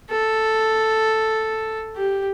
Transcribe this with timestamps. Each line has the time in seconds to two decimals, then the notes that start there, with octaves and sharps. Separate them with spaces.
0.11 A4
1.96 G4